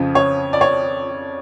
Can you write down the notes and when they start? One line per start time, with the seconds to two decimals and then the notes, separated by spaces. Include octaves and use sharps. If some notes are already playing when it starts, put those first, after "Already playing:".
Already playing: F2 C#3 F3
0.15 C#5
0.53 D5
0.61 C#5